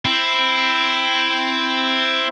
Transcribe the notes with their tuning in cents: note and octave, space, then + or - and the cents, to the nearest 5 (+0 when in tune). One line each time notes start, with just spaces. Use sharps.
C4 +0 E4 +10